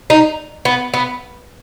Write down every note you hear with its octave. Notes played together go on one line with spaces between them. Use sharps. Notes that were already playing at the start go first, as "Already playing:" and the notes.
D#4
B3
B3